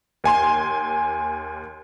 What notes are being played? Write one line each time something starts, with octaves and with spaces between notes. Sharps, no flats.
D#2 G#5 C6